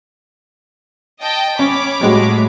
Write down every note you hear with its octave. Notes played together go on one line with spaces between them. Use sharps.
D#5 G5 A5
C#4 C#5 B5 D6
A2 G3 G#3 F#4